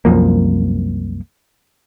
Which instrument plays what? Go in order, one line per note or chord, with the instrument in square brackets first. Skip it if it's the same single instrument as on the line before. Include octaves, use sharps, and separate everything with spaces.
[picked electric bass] C2 F#2 F3 A#3